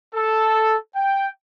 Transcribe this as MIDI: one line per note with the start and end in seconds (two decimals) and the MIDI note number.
0.14 0.77 69
0.95 1.28 79